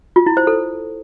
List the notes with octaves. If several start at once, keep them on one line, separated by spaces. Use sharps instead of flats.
F4
E4
C5
A4